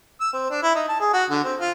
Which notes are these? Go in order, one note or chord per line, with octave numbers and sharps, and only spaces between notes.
E6
C4
D4
E4
D#4
A5
G#4
F#4
D3
C4
F4